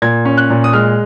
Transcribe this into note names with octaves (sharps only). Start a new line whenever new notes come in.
A#2 G#6
C#4
F#6
A#2
D#6
G#3 F6